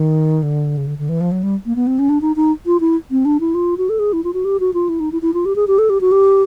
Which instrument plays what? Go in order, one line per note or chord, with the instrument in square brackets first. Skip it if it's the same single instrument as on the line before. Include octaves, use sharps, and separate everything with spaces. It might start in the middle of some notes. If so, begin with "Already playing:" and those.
Already playing: [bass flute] D#3
D3
C#3
D3
D3
E3
F3
F#3
G3
A#3
B3
C4
C#4
D4
D#4
D#4
F4
E4
C4
D4
E4
F4
F#4
A4
G#4
E4
F4
F#4
G4
F#4
F4
E4
D#4
E4
E4
F4
G4
G#4
G4
A4
G4
F#4
G4